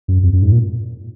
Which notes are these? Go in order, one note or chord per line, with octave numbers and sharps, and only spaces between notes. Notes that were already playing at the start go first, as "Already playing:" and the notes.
F#2
F2
F#2
G#2
A#2